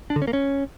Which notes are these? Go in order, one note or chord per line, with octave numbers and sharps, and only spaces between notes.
D4
D3
C#4
A#3
C#4